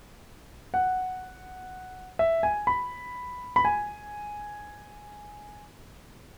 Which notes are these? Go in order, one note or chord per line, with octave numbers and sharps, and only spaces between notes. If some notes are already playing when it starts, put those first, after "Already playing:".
F#5
E5
G#5
B5
B5
G#5